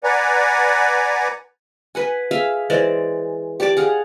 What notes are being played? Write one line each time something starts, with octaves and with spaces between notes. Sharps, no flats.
B4 D5 F#5 G#5 A#5
B4 F#5 G#5
G#4 E5 F5
E3 G#3 C5 D5
G4 D5 A5 D6
G#4 F5 F#5